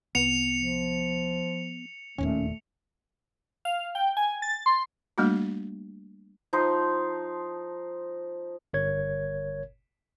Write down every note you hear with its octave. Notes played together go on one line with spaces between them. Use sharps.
C2 B3 C#7 F7
F3
E1 D#2 A#2 A3 C#4
F5
G5
G#5
A6
C6
G3 A3 A#3 D4 F#4
F3 D#4 C6
G1 A#4 C#5 G#6